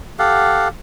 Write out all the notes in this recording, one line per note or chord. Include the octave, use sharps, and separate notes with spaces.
G4 A4 F5 F#5